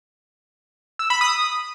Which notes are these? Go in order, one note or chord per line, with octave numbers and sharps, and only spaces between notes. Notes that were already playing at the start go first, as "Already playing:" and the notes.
E6
B5
D#6